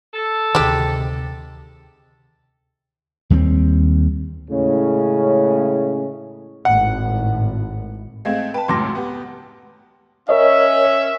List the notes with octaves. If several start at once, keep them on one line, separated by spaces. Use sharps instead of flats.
A4
D2 C3 D#3 G#3 G4
D#2 G3 G#3 C4
A2 C#3 G#3 C#4
G#1 A2 F#5
G#3 A3 C4 D#5 F5 G#6
B4 G5 A5
C#2 F#2 A2 C6 D6 A#6
B3 G4
C#4 A#4 C#5 D#5 E5